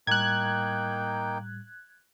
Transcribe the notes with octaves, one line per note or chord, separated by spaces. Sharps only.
A2 G3 A#3 D#4 G5 F#6 G#6